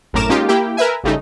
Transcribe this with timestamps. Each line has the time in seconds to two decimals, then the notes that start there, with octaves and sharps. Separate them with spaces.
0.13 G#1 F#2 A2 A#4 D6 E7
0.29 G#3 A#3 C#4 D#4 F4 G4
0.48 A#3 E4 G4 G5
0.77 A#4 B4 E5 G#5
1.04 G#1 C#3 G3 A3 D#4